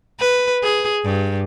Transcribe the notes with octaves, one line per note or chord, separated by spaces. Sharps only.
B4
G#4
G2